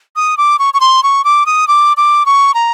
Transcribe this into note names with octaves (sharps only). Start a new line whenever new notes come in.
D#6
D6
C#6
C#6
C6
C#6
D6
D#6
D6
D6
C#6
A#5